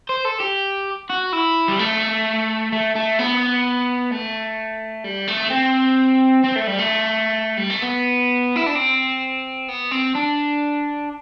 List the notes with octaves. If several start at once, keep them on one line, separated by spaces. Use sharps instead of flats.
C5
A4
G4
F#4
E4
G3
A3
A3
A3
B3
A3
G3
A3
C4
C4
A3
G3
A3
G3
A3
B3
E4
D4
C4
B3
C4
D4